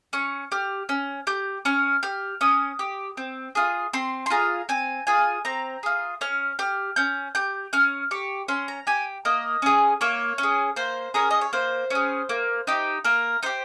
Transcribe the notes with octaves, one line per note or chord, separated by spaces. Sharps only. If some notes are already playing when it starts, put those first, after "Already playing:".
C#4 C#6
G4 F6
C#4
G4 G6
C#4 F6
G4 F6
C#4 D#6
G4
C4
F4 G#4
C4 C6
C6
F4 G#4 A#5
C4 G#5
F4 G#4 G#5
C4 A#5
F4 G#4
C#4 F6
G4 F6
C#4 G6
G4 G6
C#4 F6
G4 C#6
C#4 C6
A#5
G4 G#5
A#3 D#5
C#4 G#4
A#3 C#5
C#4
G#4
A#3 C5
C#4 G#4 A#4
D#5
C#5
A#3 C5
C#4 G#4
A#3
D#4 G4
A#3 A#4
D#4 G4 C5